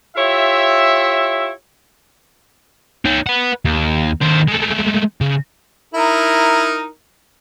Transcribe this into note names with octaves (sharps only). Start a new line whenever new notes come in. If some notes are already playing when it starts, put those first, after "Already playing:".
E4 F4 G4 C#5 E5
D#4 C#5
B4 F#5
D#2
D#2 C5
G#3 A3
C#3
D#4 E4 A#4